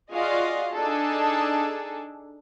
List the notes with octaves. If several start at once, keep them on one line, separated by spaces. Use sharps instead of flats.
F4 F#4 G#4 D5 D#5 F5
D4 D#4 G#4 A4